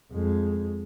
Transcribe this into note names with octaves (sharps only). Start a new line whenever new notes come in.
F2 G#3